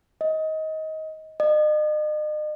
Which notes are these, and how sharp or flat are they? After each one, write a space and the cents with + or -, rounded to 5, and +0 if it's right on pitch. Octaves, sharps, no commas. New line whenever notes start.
D#5 +20
D#5 -40